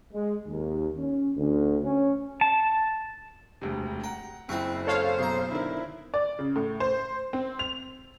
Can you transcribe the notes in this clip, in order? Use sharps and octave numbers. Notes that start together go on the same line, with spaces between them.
G#3
D#2
C#4
D2
C#4
A5
E1 D2 C3
F#5 G5 A#5
F#1 C4 E4 F#4
A4 C5 C#5 F5
B1 A#5
D3 D#3 E4 A#4
D5
C#3
A2
C5
C4
F7